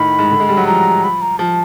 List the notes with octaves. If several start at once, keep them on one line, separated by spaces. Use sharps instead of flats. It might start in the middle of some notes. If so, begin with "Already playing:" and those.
Already playing: A2 D#3 B5
G#2
D3
G#3
G3
F#3
F3 A#5
B5
A#5
F3 A5